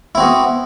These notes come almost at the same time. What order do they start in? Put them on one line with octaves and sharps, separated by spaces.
E4 C4 F#4 B3